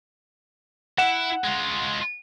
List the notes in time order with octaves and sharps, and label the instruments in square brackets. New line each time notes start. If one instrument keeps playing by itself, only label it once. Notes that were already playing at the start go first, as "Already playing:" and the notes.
[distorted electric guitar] E4 [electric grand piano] F#5 E7
[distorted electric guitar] G#3 F4